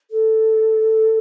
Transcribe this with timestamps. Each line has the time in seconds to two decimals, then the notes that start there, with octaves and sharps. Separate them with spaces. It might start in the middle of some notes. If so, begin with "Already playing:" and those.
0.10 A4